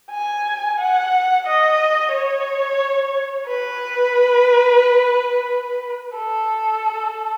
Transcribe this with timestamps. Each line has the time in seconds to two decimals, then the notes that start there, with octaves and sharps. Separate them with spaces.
0.11 G#5
0.79 F#5
1.46 D#5
2.13 C#5
3.47 B4
6.17 A4